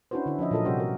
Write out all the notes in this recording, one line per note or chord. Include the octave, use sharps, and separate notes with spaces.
C#4 D4 E4 F#4 B4 C5
D3 E4
F3 C#4 D#5 E5
A#2 F#3 F4 A4 A#4 D#5
C3 G3 C#4 F#4 G4 C5
F#4 A#4